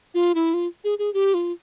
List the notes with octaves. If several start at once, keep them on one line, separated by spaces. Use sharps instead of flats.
F4
E4
F4
G#4
G#4
G4
F4